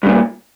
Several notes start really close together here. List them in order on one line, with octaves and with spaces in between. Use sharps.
G2 C#3 A#2